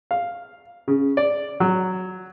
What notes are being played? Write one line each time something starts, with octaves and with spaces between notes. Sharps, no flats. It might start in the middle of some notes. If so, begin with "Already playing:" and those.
F5
C#3
D5
F#3